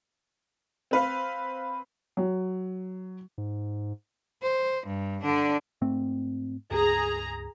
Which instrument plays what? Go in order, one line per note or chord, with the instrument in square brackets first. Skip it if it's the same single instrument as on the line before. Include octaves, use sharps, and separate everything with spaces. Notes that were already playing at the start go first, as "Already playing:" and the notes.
[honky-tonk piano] C4 B4 F5
[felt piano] F#3
[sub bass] G#2
[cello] C5
G2
D3 D4
[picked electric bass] G#2 A3 C4
[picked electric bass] C#2 G2 [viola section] G#4 A#5